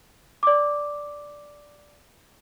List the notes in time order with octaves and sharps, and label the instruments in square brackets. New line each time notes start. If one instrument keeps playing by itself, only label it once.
[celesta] D5 D6